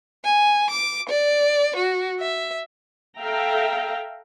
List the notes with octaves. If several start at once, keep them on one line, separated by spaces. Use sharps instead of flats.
G#5
D6
D5
F#4
E5
A4 E5 F5 G5 A#5